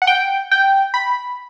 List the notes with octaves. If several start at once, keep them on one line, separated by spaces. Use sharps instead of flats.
F#5
G5
G5
B5